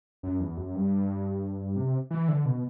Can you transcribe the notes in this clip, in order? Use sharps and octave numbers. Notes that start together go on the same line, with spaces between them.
F#2
E2
F#2
G2
C3
E3
D3
B2